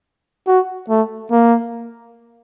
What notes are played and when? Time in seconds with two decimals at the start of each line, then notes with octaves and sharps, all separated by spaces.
0.47 F#4
0.89 A3
1.31 A#3